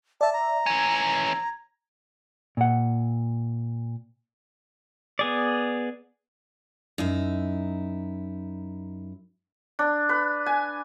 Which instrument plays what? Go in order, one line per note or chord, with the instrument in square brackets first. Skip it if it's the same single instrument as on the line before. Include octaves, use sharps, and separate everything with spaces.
[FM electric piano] D5 E5 [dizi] A5
[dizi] A#5
[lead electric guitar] E3 C#4 [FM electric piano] G#6
[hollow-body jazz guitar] A#2 F#5
[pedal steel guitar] B3 G#4 D5
[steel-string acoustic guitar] F#2 D#4 E4
[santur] D4
B4
G#5